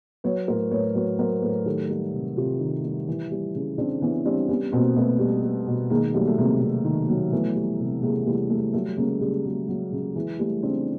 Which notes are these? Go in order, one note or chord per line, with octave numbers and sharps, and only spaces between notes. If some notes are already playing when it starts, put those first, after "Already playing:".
F#3 B4 C#5
A2 A#4 C5
A2 B4 C#5
F#3 B4 C#5
F#3 A#4 C5
A2 A4 B4
D#3 G4 A4
G3
C3
C3 F4 G4
D#3
G3
E3
G3
C#3
C#3 C4 D4
E3 B3 C#4
G3 C4 D4
G3 B3 C#4
B2 A#3 C4
B2 A3 B3
G3
G3
B2
D#3 G#3 A#3
F#3 G3 A3
A3
C3 G#3 A#3
C3
D#3
F#3
E3 A3 B3
G3
C3
C3 G#3 A#3
E3 G3 A3
G3 A3
F#3 G3 A3
C#3 G#3 A#3
C#3 G3
F#3 G#3
F#3
C#3
E3 G#3
G3 A3
C#3 C4 D4